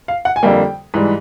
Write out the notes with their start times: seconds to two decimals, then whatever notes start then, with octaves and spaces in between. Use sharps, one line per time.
0.08 F5
0.25 F#5
0.36 G#5
0.43 F2 D3 G3 A#3 G5
0.94 G#2 E3 G3